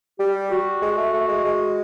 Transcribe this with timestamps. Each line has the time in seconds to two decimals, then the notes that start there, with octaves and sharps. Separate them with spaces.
0.19 G3 G4
0.51 F#4
0.82 G#3
0.98 A3
1.13 A3
1.28 G#3
1.44 G#3